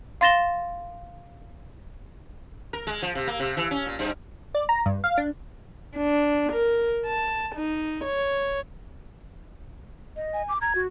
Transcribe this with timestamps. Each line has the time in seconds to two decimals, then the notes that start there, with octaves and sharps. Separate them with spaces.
0.21 F5 C6 A6 A#6 E7 G7
2.73 A#4
2.87 G#3
3.02 F3
3.15 C3
3.27 A#3
3.40 C3
3.57 E3
3.71 C#4
3.86 A#2
3.99 G2
4.55 D5
4.69 A#5
4.86 G2
5.04 F5
5.18 D4
5.96 D4
6.52 A#4
7.06 A5
7.55 D#4
8.04 C#5
10.16 D#5
10.34 G#5
10.49 D6
10.61 A#5 G#6
10.75 F#4